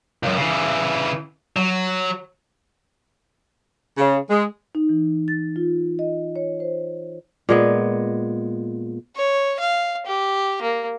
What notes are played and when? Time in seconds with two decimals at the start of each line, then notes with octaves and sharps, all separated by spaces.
0.23 C#2 F#2
0.37 C#3 E3
1.56 F#3
3.98 C#3
4.30 G#3
4.75 D#4
4.89 E3
5.28 A6
5.56 F4
5.99 D#5
6.36 C#5
6.60 C5
7.49 A#2 G#3 B3
9.16 C#5
9.59 F5
10.06 G4
10.62 A#3